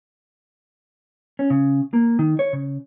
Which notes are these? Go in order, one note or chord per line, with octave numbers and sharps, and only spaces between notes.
C#4
C#3
A#3
D#3
C#5
C#3